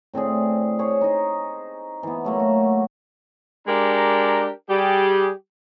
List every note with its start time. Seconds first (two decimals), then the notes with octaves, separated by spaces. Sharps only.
0.14 A2 C4 D4 G#4
0.79 G#4 C5 C#5
1.01 D#4 D#5
2.03 E3 B3
2.25 F#3 A3 A#3
2.40 F#4
3.68 G#3 D4 G4 A#4 A#5
4.70 G3 G4 G#4